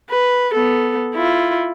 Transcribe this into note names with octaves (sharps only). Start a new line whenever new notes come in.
B4
B3 A4
E4 F4